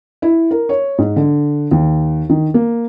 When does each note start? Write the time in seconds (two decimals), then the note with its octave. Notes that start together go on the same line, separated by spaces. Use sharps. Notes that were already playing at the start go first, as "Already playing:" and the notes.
0.22 E4
0.51 A#4
0.69 C#5
0.98 G#2
1.16 D3
1.71 D#2
2.30 D#3
2.54 A#3